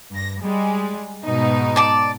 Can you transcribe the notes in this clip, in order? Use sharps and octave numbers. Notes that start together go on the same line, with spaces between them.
G2 A#6
G3 G#3
G#2 B2 D#4
D5 A5 D6